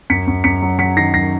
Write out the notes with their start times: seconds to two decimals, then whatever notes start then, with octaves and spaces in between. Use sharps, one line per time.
0.10 F#2 B6 C#7
0.27 F#2
0.44 F#2 B6 C#7
0.62 F#3
0.79 F#3 B6 C#7
0.97 D#3 A#6 C7
1.14 F#2 A#6 C7